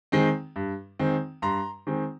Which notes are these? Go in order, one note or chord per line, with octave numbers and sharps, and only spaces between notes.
D#3 G#3 C4
G2
D#3 G#3 C4
G2 A#5 C6
D#3 G#3 C4